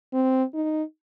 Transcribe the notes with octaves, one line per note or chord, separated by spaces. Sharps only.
C4
D#4